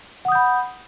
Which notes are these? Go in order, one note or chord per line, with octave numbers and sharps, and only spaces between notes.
F#5 B5 D#6 G6